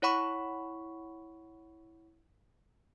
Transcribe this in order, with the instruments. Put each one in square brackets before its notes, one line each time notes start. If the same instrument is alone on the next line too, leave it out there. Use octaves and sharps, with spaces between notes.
[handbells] E4 C#5 F#5 B5 C#6